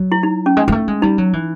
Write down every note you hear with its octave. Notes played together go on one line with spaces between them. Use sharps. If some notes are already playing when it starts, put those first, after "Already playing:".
Already playing: F#3
E4
D#4
C#4
G#3
G#3
A3
G#3
G3 D#4
F#3
E3